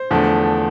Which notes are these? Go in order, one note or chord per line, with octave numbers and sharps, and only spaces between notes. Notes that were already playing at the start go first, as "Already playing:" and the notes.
Already playing: C5
E2 D3 F3 A3